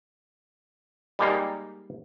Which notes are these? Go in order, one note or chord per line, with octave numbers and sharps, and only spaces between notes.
G3 G#3 A#3 D#4 F5